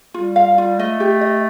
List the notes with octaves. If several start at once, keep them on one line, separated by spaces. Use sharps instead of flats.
G3 F4
F5
F4
A3 D#5
G4
D#5